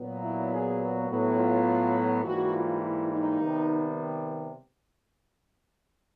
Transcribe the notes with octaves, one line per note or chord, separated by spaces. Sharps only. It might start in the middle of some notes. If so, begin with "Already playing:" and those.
Already playing: A#2 F#3 B3
E4
G#4
F#4
A2 F#3 B3
F4
G#2 E3 G3 A#3 F#4
F4
E4
D#4
C3 D#3 G3 B3